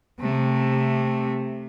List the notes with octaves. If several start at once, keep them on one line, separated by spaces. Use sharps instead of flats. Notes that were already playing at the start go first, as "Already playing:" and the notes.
C3 A3